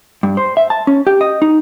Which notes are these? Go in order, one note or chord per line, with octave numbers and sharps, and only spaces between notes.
G2
C5
E5
A5
C#4
G4
D#5
D#4